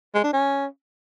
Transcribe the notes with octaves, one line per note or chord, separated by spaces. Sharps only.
G#3
D4
C#4